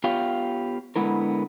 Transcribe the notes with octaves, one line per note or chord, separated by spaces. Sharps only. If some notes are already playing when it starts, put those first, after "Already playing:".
B3 F4 G4 C#5 F5
D3 G#3 B3 E4 A#4